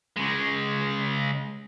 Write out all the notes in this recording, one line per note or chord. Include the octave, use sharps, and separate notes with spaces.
C#3 G#3